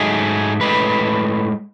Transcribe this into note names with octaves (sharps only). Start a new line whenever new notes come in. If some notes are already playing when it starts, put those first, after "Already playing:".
Already playing: G#2 F#3 A3 G#4
A2 G#3 B4